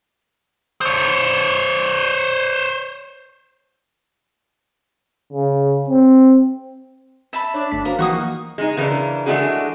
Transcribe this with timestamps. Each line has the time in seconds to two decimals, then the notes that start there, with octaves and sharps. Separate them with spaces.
0.81 C5 C#5
5.33 C#3
5.88 C4
7.33 E5 A5 B5
7.54 D4 C#5
7.72 G1 A3 B6
7.85 F#4 A#4 C5 F5
7.99 E3 F3 A#3 D#4 F#4 C#6 D#6
8.58 G#3 D#4
8.77 C#3 E3 A#3 D4 F4 A#4
9.26 E3 G#3 A3 D4 F#4 G#4